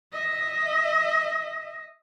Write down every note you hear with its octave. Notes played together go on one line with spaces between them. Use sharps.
D#5 E5